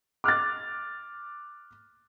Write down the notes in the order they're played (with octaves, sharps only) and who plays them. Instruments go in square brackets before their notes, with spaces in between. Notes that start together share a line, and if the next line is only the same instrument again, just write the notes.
[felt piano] D6 F6 F#6 A6